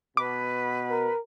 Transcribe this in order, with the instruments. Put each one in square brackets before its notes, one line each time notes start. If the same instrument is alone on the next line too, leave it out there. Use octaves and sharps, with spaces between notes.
[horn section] B2 [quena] B4 [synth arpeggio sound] D6
[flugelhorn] A#4